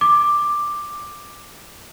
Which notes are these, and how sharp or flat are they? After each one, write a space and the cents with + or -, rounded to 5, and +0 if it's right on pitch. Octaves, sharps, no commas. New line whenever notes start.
D6 +10